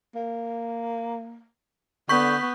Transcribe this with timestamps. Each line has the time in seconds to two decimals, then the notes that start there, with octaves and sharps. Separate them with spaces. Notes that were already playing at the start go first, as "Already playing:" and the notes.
0.15 A#3
2.09 D3 B3 C#6 G6 B6